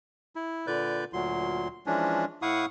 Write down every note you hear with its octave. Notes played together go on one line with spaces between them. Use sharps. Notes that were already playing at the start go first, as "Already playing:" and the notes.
E4
A#2 D3 B4 D5 G6
D2 A#2 F#3 C6
E3 F3 G#3 C#4 D4
A2 E4 F5 F#5 C#6 D#6